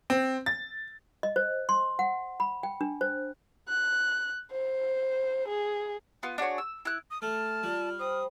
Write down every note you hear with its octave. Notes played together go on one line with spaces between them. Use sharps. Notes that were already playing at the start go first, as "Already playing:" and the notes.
C4
A6
D#5
C5
C6
F#5
B5
G5
D4
C5
F#6
C5
G#4
B3 F4
D4 F#4 G#4 C#5
E6
E4 F#6
D#6
A3 A5 F6
G3 F4 D5
C5 G5 B5 D#6